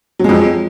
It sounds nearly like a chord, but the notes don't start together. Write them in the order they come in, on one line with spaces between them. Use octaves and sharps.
F#3 G#3 F2